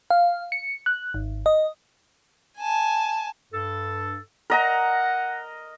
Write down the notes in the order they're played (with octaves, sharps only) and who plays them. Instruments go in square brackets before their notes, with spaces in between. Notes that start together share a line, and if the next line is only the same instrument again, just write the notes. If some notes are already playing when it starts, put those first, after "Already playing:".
[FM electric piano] F5
C#7
F#6
G#1
D#5
[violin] G#5 A5
[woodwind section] G2 A4
[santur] A#4 D#5 A#5 [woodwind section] F#5